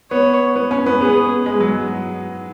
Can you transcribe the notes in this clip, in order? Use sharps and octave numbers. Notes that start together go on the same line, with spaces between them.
B3 C#5
B3
C#4
B3
B3 G#4
G#3
F#3